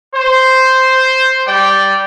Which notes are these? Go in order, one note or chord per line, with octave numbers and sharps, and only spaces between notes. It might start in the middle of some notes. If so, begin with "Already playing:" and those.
C5
G3 D5 G5